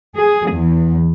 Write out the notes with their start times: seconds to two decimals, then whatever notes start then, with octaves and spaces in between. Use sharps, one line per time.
0.16 G#4
0.51 E2